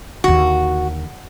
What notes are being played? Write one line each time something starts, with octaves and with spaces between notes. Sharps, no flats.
D#2 D3 F#4